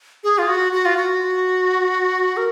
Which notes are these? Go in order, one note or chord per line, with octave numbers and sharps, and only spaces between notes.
G#4
F4
F#4
F#4
F4
F#4
A#4